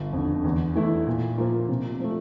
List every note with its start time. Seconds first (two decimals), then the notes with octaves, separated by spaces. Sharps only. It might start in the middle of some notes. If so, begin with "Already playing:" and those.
Already playing: G1
0.13 F2 D3
0.44 E2
0.75 E3 A3 E4
1.07 A#2
1.38 F3 A#3 F4
1.68 C3
2.00 F3 A3